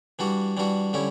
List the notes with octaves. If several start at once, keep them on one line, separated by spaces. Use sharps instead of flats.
E3 G3 D4 F#4
E3 G3 D4 F#4
D3 G3 C#4 E4